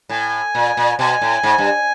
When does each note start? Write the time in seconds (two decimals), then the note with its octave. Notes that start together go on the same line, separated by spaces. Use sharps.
0.09 A2 G#5
0.55 A#2
0.77 A#2
0.99 B2 G#5
1.21 A2
1.43 G#2
1.58 G2